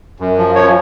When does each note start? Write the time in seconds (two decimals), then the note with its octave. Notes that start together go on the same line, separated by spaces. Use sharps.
0.20 F#2
0.38 F3
0.55 F3 C#5